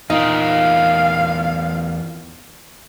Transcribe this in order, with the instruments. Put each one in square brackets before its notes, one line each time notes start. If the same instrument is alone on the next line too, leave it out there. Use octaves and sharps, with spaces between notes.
[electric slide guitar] E2 F4 A#4 [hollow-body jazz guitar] D#4 [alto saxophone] F5